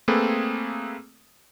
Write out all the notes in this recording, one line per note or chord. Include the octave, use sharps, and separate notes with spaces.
A3 A#3 C4 G#4 A4 B4